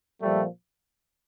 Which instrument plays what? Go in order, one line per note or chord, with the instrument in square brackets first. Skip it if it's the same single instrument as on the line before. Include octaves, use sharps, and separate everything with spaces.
[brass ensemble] A#2 F3 G3 A3